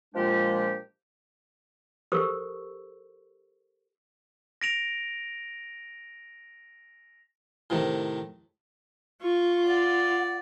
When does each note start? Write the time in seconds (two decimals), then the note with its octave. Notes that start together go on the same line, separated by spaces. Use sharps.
0.15 A#2 F3 G#3 D4 G4
2.12 G4 A4 A#4 C5 C#6 E6
4.61 A#6 D7 F7
7.70 A2 C3 D#3
9.22 F4 C#6
9.66 D5 F#5